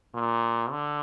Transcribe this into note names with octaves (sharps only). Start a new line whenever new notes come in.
A#2
D3